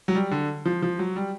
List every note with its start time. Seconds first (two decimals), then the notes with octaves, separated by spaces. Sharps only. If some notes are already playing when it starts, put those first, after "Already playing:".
0.08 F#3
0.15 G3
0.31 D3
0.65 F3
0.82 F3
0.99 F#3
1.16 G3